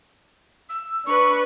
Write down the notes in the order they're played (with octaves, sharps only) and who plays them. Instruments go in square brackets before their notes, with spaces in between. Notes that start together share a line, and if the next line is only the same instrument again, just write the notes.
[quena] E6
[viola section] D4 B4 [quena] C#6